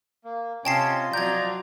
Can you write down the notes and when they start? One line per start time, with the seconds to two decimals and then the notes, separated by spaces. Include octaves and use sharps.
0.25 A#3
0.65 C3 C#4 F4 D#5 G5 A5 C7
1.13 F3 F#3 C4 D5 A#5 G6 G#6